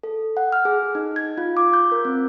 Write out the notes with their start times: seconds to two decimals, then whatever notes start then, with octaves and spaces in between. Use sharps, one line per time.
0.03 A4
0.37 F#5
0.52 F6
0.65 G#4
0.95 D#4
1.16 G#6
1.38 F4
1.57 D6
1.74 G6
1.92 A#4
2.05 C4